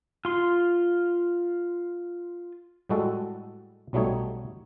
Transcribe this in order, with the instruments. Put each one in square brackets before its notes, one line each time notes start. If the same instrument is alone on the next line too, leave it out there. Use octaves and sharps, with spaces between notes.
[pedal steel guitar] F4 C6
[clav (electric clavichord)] A2 G3 G#3 F#4 A4
B1 F#3 G3 A3 D#4 C#5